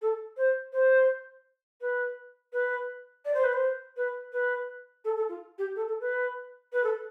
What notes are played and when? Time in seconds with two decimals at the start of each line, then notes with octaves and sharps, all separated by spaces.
0.02 A4
0.37 C5
0.73 C5
1.81 B4
2.53 B4
3.25 D5
3.34 C5
3.44 B4
3.54 C5
3.97 B4
4.32 B4
5.05 A4
5.16 A4
5.29 F4
5.58 G4
5.76 A4
5.88 A4
6.00 B4
6.73 B4
6.84 A4